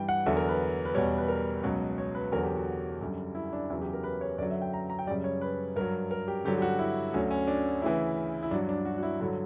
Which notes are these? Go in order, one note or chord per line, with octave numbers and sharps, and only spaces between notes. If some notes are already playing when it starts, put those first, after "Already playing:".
Already playing: G2 E3 G3 G5
F#5
E2 D3 F#3 E5
A#4
B4
B4
E2 B2 G3 C#5
B4
A#4
C#2 B2 F#3
C#5
B4
E2 D3 F#3 A#4
G4
F#4
F#2 D3 G3
E4
D4
E2 C#3 F#3 E4
G4
A#4
B4
C#5
F#2 D3 F#3 D5
E5
G5
A#5
A#5
G5
F#2 C#3 G3 D5
C#5
B4
G2 F#3 A#4
A#4
G4
G2 D3 F#3 G4
G4
F#4
E4
D2 D3 F#3 C#4
C#4
D4
D2 C#3 E3 E4
E4
G2 F#3 D4
D4
F#4
F#4
E4
G2 D3 F#3 E4